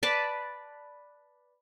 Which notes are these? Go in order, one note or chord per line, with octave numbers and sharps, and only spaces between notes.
B4 D5 A5